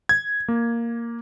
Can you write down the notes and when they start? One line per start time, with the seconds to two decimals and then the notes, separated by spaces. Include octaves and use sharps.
0.09 G#6
0.48 A#3